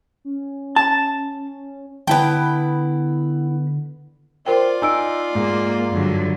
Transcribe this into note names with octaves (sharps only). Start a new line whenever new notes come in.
C#4
A5
D3 B3 E4 G5 A5
F4 A#4 C5 D5 G5
D#4 G#5 E6 D7
G#2 A#3
G2 D3 F#3